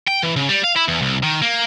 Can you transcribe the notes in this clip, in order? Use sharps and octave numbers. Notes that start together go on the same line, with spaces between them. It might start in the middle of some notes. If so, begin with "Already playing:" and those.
G5
E3
C#3
G3
F5
E4
E2
C2
D#3
A#3